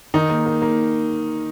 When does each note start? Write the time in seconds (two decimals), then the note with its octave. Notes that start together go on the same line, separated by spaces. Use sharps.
0.14 D#3 D#4
0.29 A#3
0.46 A#3
0.62 A#3